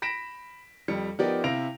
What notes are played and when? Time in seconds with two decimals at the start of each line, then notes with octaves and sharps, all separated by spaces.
0.02 B5 A#6 B6 D7 E7
0.88 F2 G3 C#7
1.19 F3 B3 D#4 G4 A#4 D5
1.44 C3 E4 F5 A#6 D7 F7